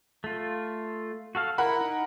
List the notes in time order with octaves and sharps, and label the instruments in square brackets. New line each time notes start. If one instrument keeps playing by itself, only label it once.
[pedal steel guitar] A3 F4
F#4 A4 F5
[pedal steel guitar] E4 [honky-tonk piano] A#4 F#5 B5
[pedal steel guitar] D#4